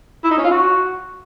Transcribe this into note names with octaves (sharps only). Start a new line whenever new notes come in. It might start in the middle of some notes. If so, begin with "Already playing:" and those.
E4
D#4
C#4
F4
F#4